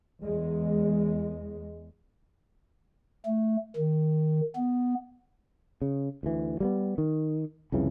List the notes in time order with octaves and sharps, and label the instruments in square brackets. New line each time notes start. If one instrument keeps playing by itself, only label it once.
[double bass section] E2 G#3
[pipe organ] A3
D#3
B3
[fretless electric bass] C#3
D2 E3
G3 A#3 B3
D#3
C2 F2 C#3 E3